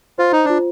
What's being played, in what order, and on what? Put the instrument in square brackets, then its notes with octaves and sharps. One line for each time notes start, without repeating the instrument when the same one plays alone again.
[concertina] F4 [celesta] C5
[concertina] D#4
[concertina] D4 [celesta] F4